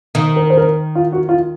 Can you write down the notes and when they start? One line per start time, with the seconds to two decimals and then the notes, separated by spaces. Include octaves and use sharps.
0.15 D#3
0.36 A#4
0.50 C5
0.57 A#4
0.95 F4
1.13 F#4
1.29 F4